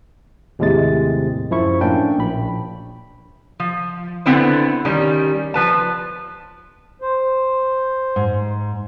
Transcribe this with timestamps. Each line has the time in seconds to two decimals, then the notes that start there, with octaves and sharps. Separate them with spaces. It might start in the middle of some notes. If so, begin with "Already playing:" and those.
0.59 D#2 A2 C3 G#3 A6
1.51 F#2 F3 E4 C#6
1.81 A2 A#3 C#4 D4 G5
2.18 A#1 B5
3.60 F3
4.26 D3 B3 C4 E4 C5
4.85 D#3 G3 C#4
5.54 F3 B4 A5
7.01 C5
8.16 G#2